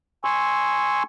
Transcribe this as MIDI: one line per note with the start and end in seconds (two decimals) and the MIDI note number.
0.24 1.03 80
0.24 1.03 84
0.24 1.03 85
0.24 1.03 88